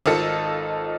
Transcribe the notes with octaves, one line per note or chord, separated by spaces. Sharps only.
G#1 D#4 F4 A4 D#5 C#7